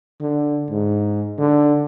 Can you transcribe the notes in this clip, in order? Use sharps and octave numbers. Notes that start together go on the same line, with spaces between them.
D3
G#2
D3